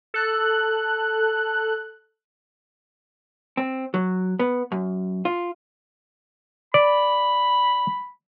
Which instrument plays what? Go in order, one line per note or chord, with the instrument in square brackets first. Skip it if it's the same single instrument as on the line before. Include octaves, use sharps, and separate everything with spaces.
[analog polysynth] A4 F#6
[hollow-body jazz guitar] C4
F#3
B3
F#2
F4
[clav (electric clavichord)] D5 [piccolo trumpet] B5